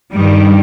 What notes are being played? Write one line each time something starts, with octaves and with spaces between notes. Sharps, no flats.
G2 D#3 G3